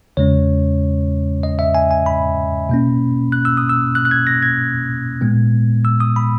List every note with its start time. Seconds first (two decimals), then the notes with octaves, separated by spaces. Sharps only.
0.17 E2 C#3 G#3 C#4 C#5
1.43 D#5
1.59 E5
1.75 G#5
1.91 G#5
2.06 B5
2.69 B2 A#3 C#4
3.32 F#6
3.45 E6
3.57 D#6
3.69 E6
3.95 F#6
4.05 F#6
4.11 G#6
4.27 A#6
4.43 G#6
5.21 A#2 G#3 B3
5.85 E6
6.00 D#6
6.16 B5